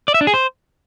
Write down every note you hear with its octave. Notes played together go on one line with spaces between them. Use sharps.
D5
E5
D4
G#4
C5